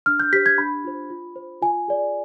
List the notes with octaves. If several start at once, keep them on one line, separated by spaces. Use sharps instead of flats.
D4 F6
G6
G4 C5 B6
G#6
D4 B5
F4 C5
F4
C5
F4 G#5
G#4 D5